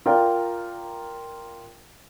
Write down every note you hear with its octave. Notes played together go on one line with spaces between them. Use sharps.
F4 A#4 D5 G5